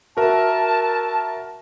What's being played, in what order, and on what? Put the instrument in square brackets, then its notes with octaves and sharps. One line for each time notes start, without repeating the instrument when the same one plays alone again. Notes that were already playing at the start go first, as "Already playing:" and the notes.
[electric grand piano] F#4 A#4 E5 [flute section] A5